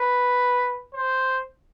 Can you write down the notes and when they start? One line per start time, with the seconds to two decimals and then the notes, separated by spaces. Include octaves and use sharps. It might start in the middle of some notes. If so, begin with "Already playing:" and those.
Already playing: B4
0.94 C5